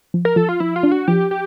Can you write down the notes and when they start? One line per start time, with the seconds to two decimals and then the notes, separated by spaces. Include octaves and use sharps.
0.14 F3
0.25 A#4
0.36 F3 A4
0.49 F4
0.60 F3 E4
0.76 F4
0.83 D4
0.92 F#4
1.08 F3 G4
1.31 G4